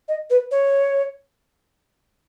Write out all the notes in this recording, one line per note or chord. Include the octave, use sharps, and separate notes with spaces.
D#5
B4
C#5